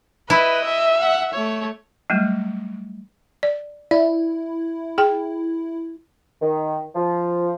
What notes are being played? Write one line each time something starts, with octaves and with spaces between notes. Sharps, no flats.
E4 B4 D#5
E5
F#5
A3 C#5
F#3 G3 A3
D5
E4 D5
G#4 G5
D#3
F3